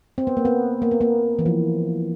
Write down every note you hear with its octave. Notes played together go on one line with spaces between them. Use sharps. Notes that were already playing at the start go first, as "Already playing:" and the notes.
C4
B3
A#3
B3
A#3
B3
A#3
E3
F3